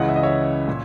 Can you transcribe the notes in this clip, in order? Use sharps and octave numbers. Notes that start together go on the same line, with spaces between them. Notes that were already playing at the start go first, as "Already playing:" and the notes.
Already playing: C#2 C#3 E3 D#5 F#5
E5
D#5
C#5 E5
A#2